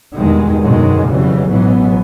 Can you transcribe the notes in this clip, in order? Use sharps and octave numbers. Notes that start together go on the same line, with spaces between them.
E2 G2 B2 D#3 G#3
F#2 B2 D3 D#3 F#3 G#3
F2 C#3 E3 F#3 G3
A1 G#2 B2 E3 F#3 B3